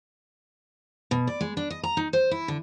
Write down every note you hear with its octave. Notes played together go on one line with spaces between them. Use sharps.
B2
D5
G#3
D4
D#5
A#5
D#4
C5
E4
D3